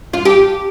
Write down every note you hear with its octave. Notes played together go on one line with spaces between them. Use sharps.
F4
G4